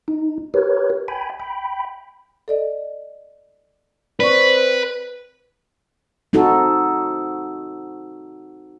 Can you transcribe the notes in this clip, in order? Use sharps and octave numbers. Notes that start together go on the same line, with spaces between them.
D#4
G4 A#4 B4 C#5
G5 G#5 B5
G5 B5
A4 D5 D#5
C4 B4 D5 C#6
C4 D#4 F#4 A4